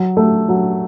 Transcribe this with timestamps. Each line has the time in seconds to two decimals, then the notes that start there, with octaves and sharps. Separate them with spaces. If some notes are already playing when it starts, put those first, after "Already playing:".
Already playing: F#3
0.17 A3
0.48 F#3